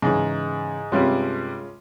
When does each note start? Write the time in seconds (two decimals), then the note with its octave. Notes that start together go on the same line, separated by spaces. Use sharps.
0.02 G#2 C#3 E3
0.92 G2 C3 G3 G#3 C#4 F4